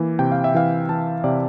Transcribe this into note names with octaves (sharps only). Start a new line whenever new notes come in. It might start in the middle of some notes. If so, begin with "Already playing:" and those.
Already playing: E3 A#3
C3 G5
F5
E5
E3 F5
E3 A5
C3 D5